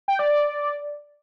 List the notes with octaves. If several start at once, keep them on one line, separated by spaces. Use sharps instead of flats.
G5
D5
D5